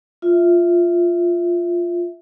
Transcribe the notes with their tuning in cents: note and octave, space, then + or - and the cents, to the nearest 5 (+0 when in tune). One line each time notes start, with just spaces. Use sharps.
F4 +0 E5 +0